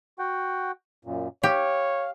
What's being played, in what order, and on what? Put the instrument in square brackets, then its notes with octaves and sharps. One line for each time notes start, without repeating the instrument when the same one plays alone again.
[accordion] F#4 F#5 G5
F#2 A#2
[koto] G4 [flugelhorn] C#5 [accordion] F5